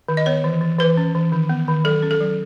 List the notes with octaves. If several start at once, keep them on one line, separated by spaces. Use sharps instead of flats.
D#3
D#5
B3 C#5
E3
E3
E3 B4
C#4
E3
D#3
B3
D#3
F#3 A4
C#4
A4
F#3